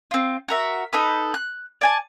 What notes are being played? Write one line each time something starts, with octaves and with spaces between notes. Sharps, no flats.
C4 F4
F#4 A#4 E5
D#4 A4 B4
F#6
D5 G#5 A5